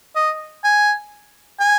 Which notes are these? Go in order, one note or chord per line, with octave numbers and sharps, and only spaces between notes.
D#5
G#5
G#5